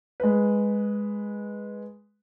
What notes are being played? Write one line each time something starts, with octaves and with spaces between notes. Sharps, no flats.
G#3 B4